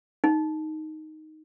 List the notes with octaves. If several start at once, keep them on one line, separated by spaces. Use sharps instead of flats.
D#4